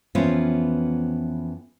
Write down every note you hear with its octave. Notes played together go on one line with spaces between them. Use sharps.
F2 E3 B3 C#4 F4 C5